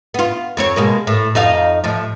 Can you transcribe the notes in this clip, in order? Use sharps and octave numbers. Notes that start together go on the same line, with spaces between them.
B3 F4
F2 C4 C#5
B2 G#3 A#3
A2
F2 D#4 F5
A2 F3